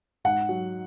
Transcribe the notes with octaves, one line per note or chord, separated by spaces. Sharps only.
G#2 F#5
F#3